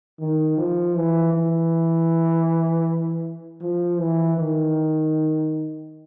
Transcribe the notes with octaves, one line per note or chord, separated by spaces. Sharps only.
D#3
F3
E3
E3
F3
E3
D#3